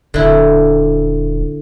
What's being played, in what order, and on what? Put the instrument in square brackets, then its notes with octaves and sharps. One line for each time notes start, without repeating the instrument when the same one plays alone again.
[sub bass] D#1 [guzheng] D3 E4